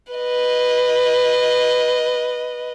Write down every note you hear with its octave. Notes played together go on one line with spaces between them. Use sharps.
B4 D#5